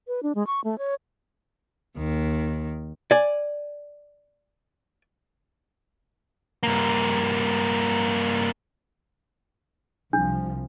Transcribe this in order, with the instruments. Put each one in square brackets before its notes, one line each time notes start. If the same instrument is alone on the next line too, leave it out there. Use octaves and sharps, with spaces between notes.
[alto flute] B4
D4
G#3
C#6
A3
C#5
[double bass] D#2 [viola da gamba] D#3
[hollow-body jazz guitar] D5 G#5
[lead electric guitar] G2 A#3
[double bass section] C2 C3 F3 [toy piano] D4